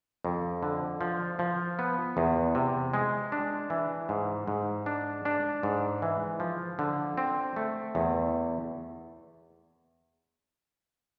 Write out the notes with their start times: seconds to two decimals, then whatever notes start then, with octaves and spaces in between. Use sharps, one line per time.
0.25 F2
0.63 D3
1.01 F3
1.39 F3
1.79 B3
2.17 E2
2.55 C3
2.94 G#3
3.32 D4
3.70 E3
4.09 G#2
4.47 G#2
4.86 D4
5.25 D4
5.63 G#2
6.02 E3
6.40 F3
6.79 D3
7.18 C4
7.56 A3
7.95 E2